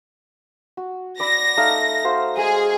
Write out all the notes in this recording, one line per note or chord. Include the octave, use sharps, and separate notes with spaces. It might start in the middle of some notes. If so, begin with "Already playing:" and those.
F#4
D5 B5 E6 A#6
A3 D#4 F5
F#4 C5 F5
G#3 G#4